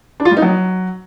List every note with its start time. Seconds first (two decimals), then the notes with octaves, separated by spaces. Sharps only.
0.20 D4
0.25 F4
0.31 G3
0.37 D#4
0.42 F#3